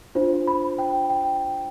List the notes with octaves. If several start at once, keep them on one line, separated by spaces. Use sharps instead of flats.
D4 F4 C5
B5
G5
G5